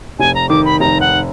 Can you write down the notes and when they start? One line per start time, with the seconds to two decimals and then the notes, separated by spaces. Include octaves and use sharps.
0.19 F1 G#5
0.35 A#5
0.49 D#3 D6
0.65 B5
0.80 F1 A#5
1.01 F#5